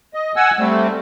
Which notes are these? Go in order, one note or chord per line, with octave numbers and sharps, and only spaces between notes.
D#5
F#5 G#5 E6
G3 A3 C4